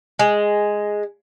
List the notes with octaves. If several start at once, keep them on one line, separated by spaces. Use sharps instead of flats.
G#3